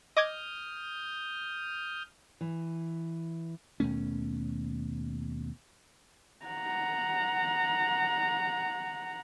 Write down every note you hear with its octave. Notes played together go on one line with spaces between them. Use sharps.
D#5 D6 D#6 F6 G6 G#6
E3
D#2 B2 A3 C#4
F#5 A#5